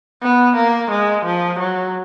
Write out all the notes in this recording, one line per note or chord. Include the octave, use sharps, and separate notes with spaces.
B3
A#3
G#3
F3
F#3